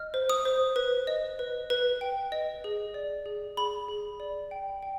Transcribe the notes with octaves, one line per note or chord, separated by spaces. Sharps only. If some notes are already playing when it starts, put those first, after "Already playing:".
Already playing: D#5 F6
C5
D#6
C5
B4
D#5
B4
B4
G5
D#5
G#4
D5
G#4
G#4 B5
G#4
D5
G5
G5